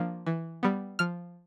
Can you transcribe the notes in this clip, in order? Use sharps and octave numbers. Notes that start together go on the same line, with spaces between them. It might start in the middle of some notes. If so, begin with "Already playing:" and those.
Already playing: F3 A#3 D4
E3
G3 B3
F3 F6